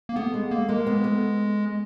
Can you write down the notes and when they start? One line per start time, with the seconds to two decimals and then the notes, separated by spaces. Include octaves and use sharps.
0.09 A#3
0.16 A3 B3
0.34 G#3
0.51 A3 A#3
0.68 G#3 A#3
0.86 B3
1.04 A3